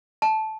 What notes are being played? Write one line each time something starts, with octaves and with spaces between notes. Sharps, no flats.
A5